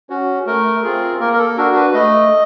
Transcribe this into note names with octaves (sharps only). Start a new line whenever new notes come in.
C#4 F#4
A3 A#4
C4 F4 G#4
A#3 A#4
A#4
A4
D4 F#4 A#4
B4
A3 D#5